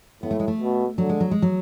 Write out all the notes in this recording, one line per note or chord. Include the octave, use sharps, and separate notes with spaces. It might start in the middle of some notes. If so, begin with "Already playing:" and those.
A2 B3
A3
G#3
A3
B2
D3 F#3
G#3
F#3
G#3
F#3